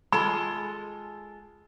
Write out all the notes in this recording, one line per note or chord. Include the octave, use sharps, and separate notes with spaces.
G#3 F4 A4 B5